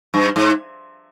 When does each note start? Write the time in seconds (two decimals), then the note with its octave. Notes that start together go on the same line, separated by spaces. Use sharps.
0.14 G2
0.36 G#2